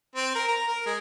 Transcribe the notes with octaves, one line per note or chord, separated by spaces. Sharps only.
C4
A#4
A#5
A#4
G#3